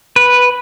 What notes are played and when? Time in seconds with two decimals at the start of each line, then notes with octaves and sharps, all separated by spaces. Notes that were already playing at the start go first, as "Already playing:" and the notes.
0.16 B4